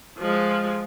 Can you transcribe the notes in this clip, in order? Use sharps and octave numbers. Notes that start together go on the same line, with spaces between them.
F3 G#3